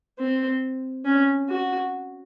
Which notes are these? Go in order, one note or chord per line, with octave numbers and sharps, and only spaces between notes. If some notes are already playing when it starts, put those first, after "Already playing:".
C4
C#4
F#4